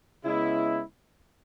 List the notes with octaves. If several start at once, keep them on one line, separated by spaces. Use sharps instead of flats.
C#3 G#3 B3 E4